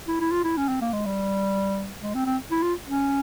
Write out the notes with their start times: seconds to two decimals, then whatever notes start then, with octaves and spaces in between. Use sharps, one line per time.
0.08 E4
0.20 E4
0.32 F4
0.44 E4
0.57 C#4
0.69 C4
0.81 A#3
0.93 G#3
1.06 G3
2.01 G#3
2.14 C4
2.26 C4
2.51 E4
2.63 F4
2.87 C#4